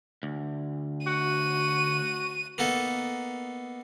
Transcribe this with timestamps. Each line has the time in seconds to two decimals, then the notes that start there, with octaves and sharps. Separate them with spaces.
0.23 D2
1.07 F#4 D#7
2.58 A#3 B3 D#4 A4